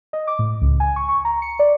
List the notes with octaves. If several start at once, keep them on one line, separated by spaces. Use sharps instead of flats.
D#5
D6
A2
C#2
G#5
C#6
C#6
A#5
C#7
D5